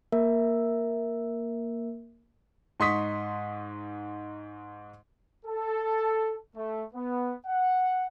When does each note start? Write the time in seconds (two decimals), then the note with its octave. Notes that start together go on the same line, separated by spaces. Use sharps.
0.12 A#3 A#4 E5
2.80 G#2 D#4 C6 C#6 D#6 B6
5.46 A4
6.56 A3
6.94 B3
7.47 F#5